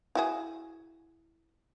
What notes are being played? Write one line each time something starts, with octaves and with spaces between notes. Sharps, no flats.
E4 F#4 G#4